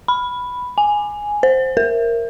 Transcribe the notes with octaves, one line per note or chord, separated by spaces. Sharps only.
B5
G#5
C5
A#4